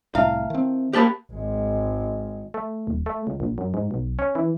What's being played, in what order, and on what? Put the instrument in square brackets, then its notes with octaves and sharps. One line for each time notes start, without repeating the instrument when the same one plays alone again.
[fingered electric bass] C2 A2 A3 [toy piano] E4 E5 A5 [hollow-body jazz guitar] F5
[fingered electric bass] D#3 C4
[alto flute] A#3 [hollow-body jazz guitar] G4 B4 A5 [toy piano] C5 B5
[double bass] G#1 G#3
[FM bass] A3
D#1
A3
C#2
A#1
F#2
G#2
B1
C#4
E3